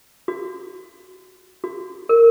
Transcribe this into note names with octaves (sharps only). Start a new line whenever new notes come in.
F#4
F#4
A#4